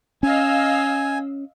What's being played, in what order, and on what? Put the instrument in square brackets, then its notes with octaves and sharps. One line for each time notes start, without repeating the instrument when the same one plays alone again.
[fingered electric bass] C#4 [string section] D#5 F5 E6 [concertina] G#5